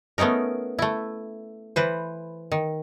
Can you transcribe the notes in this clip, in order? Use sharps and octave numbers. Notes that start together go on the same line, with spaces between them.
A3 B3 C#4 D#4 A#4
A3 E4
E3 B4 C5
D#3